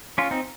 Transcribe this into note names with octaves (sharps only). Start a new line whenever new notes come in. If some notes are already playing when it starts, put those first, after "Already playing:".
C#4 F4
C4 D#4